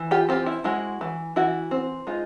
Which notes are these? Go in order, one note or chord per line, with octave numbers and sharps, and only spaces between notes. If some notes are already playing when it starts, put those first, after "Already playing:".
Already playing: E3
F4 G4
C4 F4 G4
E4
G#3 E4 F#4
E3
E3 E4 F#4
C4
G#3 D#4 F4